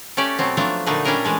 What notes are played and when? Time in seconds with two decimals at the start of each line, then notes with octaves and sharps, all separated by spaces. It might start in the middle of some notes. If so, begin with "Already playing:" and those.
0.17 A3 C#4 G4 D5
0.39 B2 F#3 C4
0.57 F3 F#3 A3 B3 D4
0.86 A#2 D3 A3 A#3 D#4 B4
1.05 G3 C#4 D4 E4 A#4 D#5
1.25 E3 G#3 A3